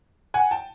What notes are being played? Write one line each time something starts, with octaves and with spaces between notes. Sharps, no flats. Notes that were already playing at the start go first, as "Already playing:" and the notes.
F#5 G#5
G5 A5